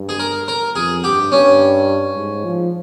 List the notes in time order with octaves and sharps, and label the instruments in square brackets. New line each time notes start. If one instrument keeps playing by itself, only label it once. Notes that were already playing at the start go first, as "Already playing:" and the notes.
Already playing: [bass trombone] G2
[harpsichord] G#4
A#4
A#4
[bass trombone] F2 [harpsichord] G#4
[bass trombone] G2 [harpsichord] G4
[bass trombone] G2 [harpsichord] C#4
[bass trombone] G#2
F3